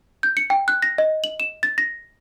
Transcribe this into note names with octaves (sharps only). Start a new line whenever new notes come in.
G6
C#7
G5
F#6
A#6
D#5
F#7
E7
A6
A#6